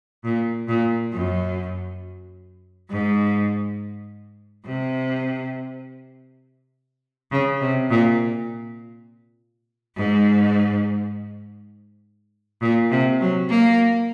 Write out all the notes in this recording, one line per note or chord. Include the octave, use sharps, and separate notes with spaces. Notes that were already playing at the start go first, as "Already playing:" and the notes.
A#2
A#2
F#2
G#2
C3
C#3
C3
A#2
G#2
A#2
C3
F#3
A#3